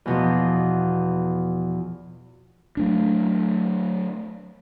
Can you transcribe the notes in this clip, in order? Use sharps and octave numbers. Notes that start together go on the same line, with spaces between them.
E2 B2 F3
F#3 A3 D4